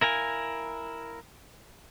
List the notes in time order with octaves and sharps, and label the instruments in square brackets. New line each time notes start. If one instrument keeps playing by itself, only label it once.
[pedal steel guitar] E4 A#4 F5 G#5